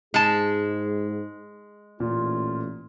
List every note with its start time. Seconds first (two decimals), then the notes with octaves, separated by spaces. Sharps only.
0.14 G#2 G#3 G#4 A5
2.00 A1 A#2 F4